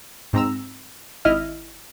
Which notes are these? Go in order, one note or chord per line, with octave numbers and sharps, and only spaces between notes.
G#2 C4 A#5 E6
G#1 E4 D#5 E5 F6